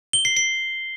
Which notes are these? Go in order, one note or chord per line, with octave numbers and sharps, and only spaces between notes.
G7
C7
C7